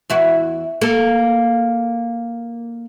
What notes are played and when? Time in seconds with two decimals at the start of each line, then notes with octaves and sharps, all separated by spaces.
0.10 E2 E4 F#4
0.81 A#3 A4